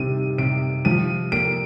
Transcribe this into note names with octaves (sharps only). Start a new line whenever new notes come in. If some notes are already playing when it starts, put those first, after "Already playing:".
Already playing: C3 D#3 G3 D#7
C3 D7
F3 D#7
A#3 D7